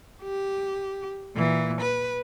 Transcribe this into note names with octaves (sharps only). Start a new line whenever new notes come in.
G4
A#2 E3
B4